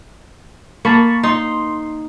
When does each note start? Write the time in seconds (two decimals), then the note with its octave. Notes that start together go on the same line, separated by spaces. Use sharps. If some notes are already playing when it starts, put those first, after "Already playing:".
0.85 A#3 A5 B5 C#6
1.23 D#4 C6